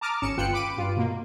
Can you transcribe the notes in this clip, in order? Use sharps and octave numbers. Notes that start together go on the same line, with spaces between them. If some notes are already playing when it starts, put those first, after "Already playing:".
A5 A#5 D6 D#6 F6
G#1 C#4 C#7 E7
G1 B3 F4 G5 F#6 C#7
B5 D6 D7 D#7
G2 F4
B2 A#3